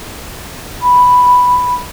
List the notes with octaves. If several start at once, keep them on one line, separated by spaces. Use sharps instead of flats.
B5